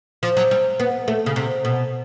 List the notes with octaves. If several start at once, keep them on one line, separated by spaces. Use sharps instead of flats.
F3
F#3
G3
B3
A3
C#3
C3
B2